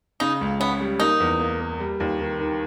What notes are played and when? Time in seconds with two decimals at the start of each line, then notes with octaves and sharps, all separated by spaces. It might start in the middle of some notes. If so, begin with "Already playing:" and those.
0.20 C#3 D#4
0.41 C#2
0.60 B3 C#4
0.80 G3
0.99 A#3 D#4
1.20 E2
1.39 A#3
1.60 A#3
1.80 G3
2.00 D#2
2.20 D#3
2.39 D#3